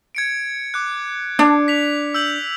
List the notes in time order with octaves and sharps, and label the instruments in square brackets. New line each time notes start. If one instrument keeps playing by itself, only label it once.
[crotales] G#6 C#7 D7
D6 F#6
[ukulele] D4
[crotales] B6 F7
E6 G6 F#7